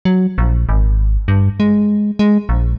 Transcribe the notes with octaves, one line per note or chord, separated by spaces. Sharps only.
F#3
A#1
G#1
G2
G#3
G#3
A#1